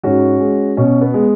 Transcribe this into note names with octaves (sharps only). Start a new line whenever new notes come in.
G#2 C#4 F#4
G#3
B2 C#4
B3
G#3